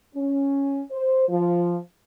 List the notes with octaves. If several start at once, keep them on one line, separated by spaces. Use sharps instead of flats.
C#4
C5
F3